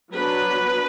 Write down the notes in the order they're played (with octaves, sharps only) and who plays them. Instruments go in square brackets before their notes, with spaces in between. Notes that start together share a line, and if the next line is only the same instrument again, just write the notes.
[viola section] F#3 B3 D4 B4